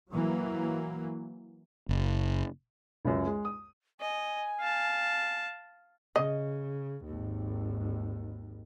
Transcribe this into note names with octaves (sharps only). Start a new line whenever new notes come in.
E3 F#3 A#3
F#1
C#2 F#2
G#3
D#6
D#5 G#5
F5 A5
C#3 D#5
G#1 D#2